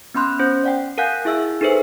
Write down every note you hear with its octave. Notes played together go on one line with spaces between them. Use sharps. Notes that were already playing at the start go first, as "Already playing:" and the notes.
B3 C#4 B5 C6 F#6
C#4 C5
D5 F#5 G5
A#4 F5 F#5 G#5 F#6 G6
E4 G#4 E5 E6
D#4 G#4 A4 B4 C5 E5